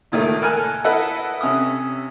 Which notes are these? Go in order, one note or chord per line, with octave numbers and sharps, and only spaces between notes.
C#2 A#2 D#3 A3
A4 A#4 G#5 F6 F#6
E4 A4 B4 D#5 E5 F#5
C3 C#4 E5 D#6